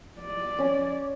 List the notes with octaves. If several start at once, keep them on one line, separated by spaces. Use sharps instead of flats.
D5
C#4